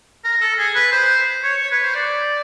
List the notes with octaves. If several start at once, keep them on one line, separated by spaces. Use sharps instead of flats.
A#4
A4
G#4
B4
C5
C#5
C#5
B4
C5
D5